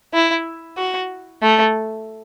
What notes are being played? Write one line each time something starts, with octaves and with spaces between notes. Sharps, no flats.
E4
F#4
A3